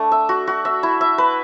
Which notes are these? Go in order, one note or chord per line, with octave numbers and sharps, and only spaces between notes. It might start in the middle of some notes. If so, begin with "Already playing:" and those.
Already playing: A3 D4
E5
F#4
F#4
E5
E4
E5
B4